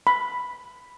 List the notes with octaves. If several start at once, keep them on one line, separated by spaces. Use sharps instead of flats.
B5